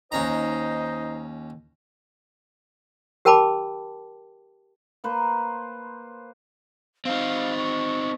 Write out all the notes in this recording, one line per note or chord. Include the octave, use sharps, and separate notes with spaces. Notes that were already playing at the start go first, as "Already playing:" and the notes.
D#2 C#4 D#4 C5 D#5 A#5
G4 A#4 G5 A5 B5 D6
A#3 B4 C5
C4 D#4 F5
C#6